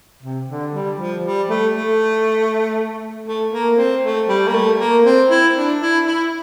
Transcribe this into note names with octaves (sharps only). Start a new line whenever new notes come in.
C3
D3
G3
F3
G3
A3
A3
A3
A#3
C4
A3
G3
A#3
A3
A#3
C4
E4
D4
E4
E4